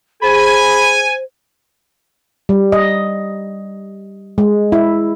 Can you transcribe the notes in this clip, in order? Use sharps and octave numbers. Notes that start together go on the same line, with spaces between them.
G#4 C5 G#5 B5
G3
D#5
G#3
E4